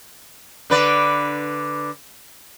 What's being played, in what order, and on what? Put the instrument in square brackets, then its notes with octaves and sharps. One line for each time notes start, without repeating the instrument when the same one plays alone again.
[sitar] D3 B4 D5